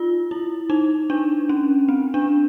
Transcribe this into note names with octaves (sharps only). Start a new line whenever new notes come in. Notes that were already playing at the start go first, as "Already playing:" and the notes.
Already playing: D#4 F4
E4
D#4
D4
C#4
C4
D4